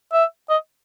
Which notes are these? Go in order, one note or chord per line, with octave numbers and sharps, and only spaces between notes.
E5
D#5